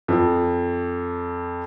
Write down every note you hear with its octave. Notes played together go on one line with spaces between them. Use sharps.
F2 F3